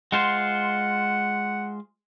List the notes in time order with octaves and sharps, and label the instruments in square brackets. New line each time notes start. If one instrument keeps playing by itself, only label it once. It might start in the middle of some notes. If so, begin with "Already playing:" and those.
[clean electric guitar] G#3 F4 C5 [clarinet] F#5